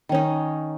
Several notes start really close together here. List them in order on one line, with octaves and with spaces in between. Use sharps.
D#3 C#4 D#4